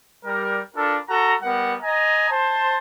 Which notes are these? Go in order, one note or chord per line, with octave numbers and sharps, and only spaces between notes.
G3 A#4
D4 F4 A4 A#4
F#4 A4 A#5
G3 B3 A#4 F#5
D#5 G#5 A#5
C5 A5